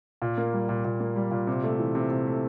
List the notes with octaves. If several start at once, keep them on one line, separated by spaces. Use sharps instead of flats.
A#2
A#3
G3
A#2
A#2
A#3
G3
A#2
C3
A3
E3
C3
C3
A3